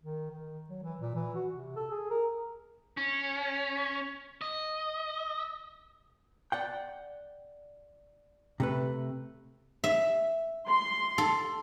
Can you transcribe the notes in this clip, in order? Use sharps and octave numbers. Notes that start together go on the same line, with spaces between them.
D#3
D#3
F#3
E3
A#2
E3
F#4
C3
A4
G#4
A#4
C#4
D#5
D5 F#5 G5
C3 A3 B4
E5
C6
A4